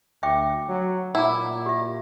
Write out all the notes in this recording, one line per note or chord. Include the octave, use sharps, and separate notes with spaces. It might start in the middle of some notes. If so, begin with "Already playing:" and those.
D2 E5 G5 D6
F#3
A#2 E4 F#5 A#5 D6
G4 E5